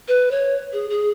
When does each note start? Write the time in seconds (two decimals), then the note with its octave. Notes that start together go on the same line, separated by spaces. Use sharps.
0.08 B4
0.31 C#5
0.73 G#4
0.90 G#4